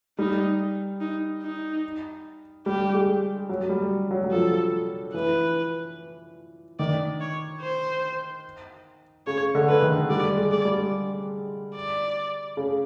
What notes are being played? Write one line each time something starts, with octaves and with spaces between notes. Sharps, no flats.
G3 D#4
D#4
D#4
G3 G4
G#3
F#3
G3
F#3
F#3
F3 A4
E3 B4
D#3 D5
C#5
C5
C#3 C#5
D3
B4
D#3
G3 D5
G#3
D5
G3
D5
C#3